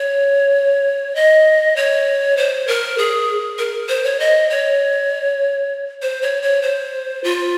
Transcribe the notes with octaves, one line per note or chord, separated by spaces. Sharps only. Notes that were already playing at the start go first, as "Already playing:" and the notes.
Already playing: C#5
D#5
C#5
C5
A#4
G#4
A#4
C5
C#5
D#5
C#5
C5
C#5
C#5
C5
F4